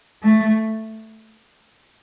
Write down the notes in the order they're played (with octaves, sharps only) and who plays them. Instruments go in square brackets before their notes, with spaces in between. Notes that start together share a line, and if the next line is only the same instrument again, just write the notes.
[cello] A3